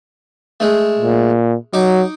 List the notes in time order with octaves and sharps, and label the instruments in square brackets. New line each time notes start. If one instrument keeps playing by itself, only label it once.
[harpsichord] G#3 A3
[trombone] A#2
[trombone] F#3 [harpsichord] D#4 D6